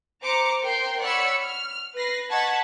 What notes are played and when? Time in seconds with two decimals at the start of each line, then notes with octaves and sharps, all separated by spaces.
0.22 C5 A#5 D6 C#7
0.62 A#4 C5 G5 C6
1.01 C#5 D5 F#5 B5 E6 C#7
1.43 F6
1.95 B4 A#6 C7
2.30 D#5 F#5 A5 C#6 G#6 B6